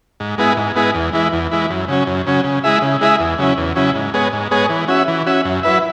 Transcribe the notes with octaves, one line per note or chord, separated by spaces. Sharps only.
G#2
G#3 B3 E4 G#4
G#2
G#3 B3 E4 G#4
E2
E3 G#3 E4
E2
E3 G#3 E4
F#2
C#3 F#3 C#4
F#2
C#3 F#3 C#4
C#3
G#3 E4 G#4 E5
C#3
G#3 E4 G#4 E5
E2
C#3 F#3 C#4 E4
E2
C#3 F#3 C#4 E4
G#2
G#3 B3 G#4 C#5
G#2
G#3 B3 G#4 C#5
E3
C#4 F#4 E5
E3
C#4 F#4 E5
F#2
F#3 E4 B4 E5